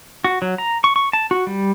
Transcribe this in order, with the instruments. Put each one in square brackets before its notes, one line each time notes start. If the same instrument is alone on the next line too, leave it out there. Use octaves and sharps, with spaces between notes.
[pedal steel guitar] F#4
F#3
A#5
C#6
C#6
A5
F#4
G3